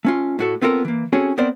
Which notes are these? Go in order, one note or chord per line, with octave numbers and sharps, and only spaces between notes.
A3 C#4 F4
A2 F#4 A4
B3 C4 F4 A4 A#4
E3 A#3
C4 C#4 F#4 G#4 A4 C#5
B3 C4 A#4 C5 D5